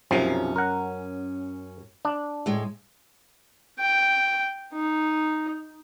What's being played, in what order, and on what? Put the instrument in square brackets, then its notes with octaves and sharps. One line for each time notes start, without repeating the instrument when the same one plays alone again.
[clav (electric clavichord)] B1 C3 F3 [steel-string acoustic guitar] F#2 C#4
[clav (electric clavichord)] A#4 F#5
D4
[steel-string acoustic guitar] A2 G#3
[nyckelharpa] G5
D#4